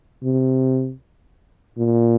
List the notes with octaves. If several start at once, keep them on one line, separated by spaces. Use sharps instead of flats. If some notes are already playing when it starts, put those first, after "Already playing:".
C3
A#2